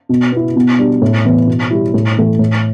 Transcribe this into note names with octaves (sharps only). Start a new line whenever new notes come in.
B2
B3 E4
B2
G3 D4
A2
E3 B3
B2
G3 E4
A2
E3 A3
A2